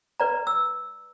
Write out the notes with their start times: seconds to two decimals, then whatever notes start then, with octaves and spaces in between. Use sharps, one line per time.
0.20 B4 D5 A#5
0.47 E6